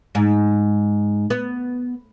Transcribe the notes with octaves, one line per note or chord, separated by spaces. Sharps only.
G#2
B3